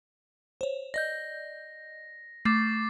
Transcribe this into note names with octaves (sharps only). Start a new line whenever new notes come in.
C5 C#5
D5 D#5 G6 A#6
A3 D6 A6 C7